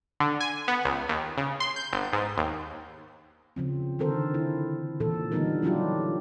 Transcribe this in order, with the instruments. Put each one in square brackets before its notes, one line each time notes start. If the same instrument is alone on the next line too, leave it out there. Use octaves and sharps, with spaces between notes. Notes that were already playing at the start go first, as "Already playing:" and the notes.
[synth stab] D3
G#5
B3
C#2
D#2
C#3
C6
G6
G1
G#2
D#2
[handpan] C#3 F3 C4
D3 D#3 C4 A4 A#4 C5
E4
A#2 E3 A4
D3 E3 G3 B3 D#4 A#4
F#3 G3 D4 E4 F4 G4